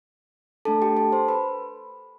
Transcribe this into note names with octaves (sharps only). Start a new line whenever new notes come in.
A3 D4 A4 A5
G4 G5
A4 A5
C5 C6
B4 B5